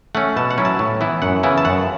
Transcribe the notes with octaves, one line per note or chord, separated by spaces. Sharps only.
A3 C#4 F#5
B2 A5
F#5
F#3 C#4 E4
A5
A2
E3 B3 E4
F#2 F#5
C#3 E3 B3 E4
A5
F#2 F#5